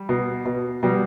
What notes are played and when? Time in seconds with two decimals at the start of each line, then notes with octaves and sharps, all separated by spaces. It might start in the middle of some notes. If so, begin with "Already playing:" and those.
Already playing: G3
0.09 B2
0.46 B2
0.83 B2 G3